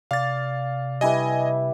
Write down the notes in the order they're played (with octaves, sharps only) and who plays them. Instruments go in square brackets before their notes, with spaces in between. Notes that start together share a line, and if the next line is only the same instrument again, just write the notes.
[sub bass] C3 [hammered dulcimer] D5 [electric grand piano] F5 A6
[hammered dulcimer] G3 E4 B4 [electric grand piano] D#5 G#5